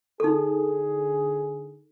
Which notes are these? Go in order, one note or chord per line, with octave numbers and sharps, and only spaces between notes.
D3 D#4 G#4 A4